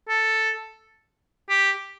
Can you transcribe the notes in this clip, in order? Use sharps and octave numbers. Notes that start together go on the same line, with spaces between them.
A4
G4